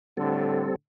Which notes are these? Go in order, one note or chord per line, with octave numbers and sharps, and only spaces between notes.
A2 D3 G3 C4 A4